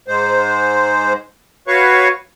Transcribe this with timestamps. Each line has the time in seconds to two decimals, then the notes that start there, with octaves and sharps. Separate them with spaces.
0.08 G#2 G#3 C5
1.68 F#4 B4 C#5 F5 C#6